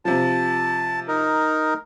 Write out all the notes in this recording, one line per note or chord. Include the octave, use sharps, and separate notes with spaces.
C3 F3 A5
D#4 A#4